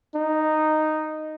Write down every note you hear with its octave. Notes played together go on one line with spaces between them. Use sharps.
D#4